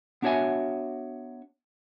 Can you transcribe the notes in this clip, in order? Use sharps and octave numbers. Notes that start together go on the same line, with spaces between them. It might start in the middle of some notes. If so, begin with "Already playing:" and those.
B3 D4 F#4 C#5 E5 G#5